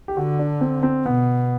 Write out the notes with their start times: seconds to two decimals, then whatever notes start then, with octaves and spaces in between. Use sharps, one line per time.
0.08 G4
0.16 D3 F#4
0.39 D4
0.61 C4
0.83 C4
1.06 B2 B3